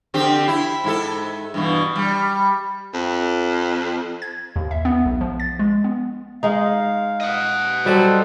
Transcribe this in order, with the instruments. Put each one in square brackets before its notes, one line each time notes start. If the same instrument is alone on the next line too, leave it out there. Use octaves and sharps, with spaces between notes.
[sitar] D3 C4 G4
E4
G#2 E4 A4
G2 B2 E3
G3
[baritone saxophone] F2
[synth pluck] G#6
D#2
E5
B3
B1
F3
A6
G#3
B3
[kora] G#3 D#4 [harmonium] F5
[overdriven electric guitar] D#5 F#5
[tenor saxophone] F#3 [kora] G3 [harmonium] A4 C5